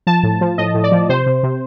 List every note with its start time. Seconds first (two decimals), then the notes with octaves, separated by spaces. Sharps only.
0.07 F3 A5
0.23 A2
0.41 F3
0.58 A2 D#5
0.74 A2
0.84 D5
0.92 F3
1.09 C3 C5
1.26 C3
1.43 C3